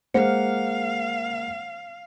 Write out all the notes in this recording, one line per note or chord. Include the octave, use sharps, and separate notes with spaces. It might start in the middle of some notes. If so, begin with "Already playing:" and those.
G#3 A#3 C5 F5 F#5 C#7